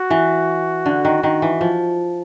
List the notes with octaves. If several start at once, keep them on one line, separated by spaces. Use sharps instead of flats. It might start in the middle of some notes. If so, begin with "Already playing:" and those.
Already playing: F#4
E3
D3
D#3
D#3
E3
F3